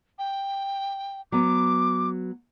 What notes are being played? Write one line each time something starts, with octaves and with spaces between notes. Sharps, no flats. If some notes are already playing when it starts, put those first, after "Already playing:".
G5
F#3 B3 D6